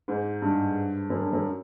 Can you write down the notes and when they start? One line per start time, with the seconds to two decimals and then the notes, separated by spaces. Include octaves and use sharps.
0.08 G#2
0.42 G2
1.10 F#2
1.21 G2
1.33 F#2